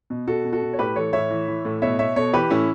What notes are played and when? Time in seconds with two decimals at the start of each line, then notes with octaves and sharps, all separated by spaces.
0.10 B2
0.27 B2 F#4 A4
0.45 B2
0.52 F#4 A4
0.62 B2
0.73 C#5
0.79 A2 G4 B4
0.96 E3 A4 C#5
1.13 A2 C#5 E5
1.31 E3
1.48 E3
1.65 A2
1.82 B2 C#5 E5
1.99 B2 C#5 E5
2.16 B2 A4 C#5
2.33 E3 G4 B4
2.50 A2 C#4 E4